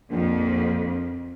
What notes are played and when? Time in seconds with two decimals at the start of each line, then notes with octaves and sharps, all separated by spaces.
0.11 A#1 F2